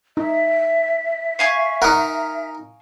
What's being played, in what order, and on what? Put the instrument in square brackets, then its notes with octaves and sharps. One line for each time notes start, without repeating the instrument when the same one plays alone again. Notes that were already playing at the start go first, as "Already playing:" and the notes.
[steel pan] D#4 [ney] E5
[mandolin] F5 G#5 C#6
[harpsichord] D#4 A#4 [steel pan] F#5